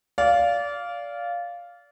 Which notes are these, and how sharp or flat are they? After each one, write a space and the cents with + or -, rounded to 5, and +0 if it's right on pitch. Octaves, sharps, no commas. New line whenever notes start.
D5 -25 F5 +0